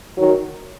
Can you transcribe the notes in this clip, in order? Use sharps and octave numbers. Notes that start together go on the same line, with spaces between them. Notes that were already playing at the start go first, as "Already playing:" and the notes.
D#3 F#3